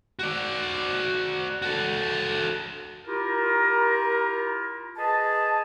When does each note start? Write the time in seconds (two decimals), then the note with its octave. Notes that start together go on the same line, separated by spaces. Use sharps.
0.19 F#4 D5
1.62 F#4 A4
3.06 E4 F4 G4 A#4
4.97 G#4 B4 D#5 G#5 A5